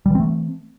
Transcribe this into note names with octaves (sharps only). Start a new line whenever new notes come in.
E3 G3 A3 C4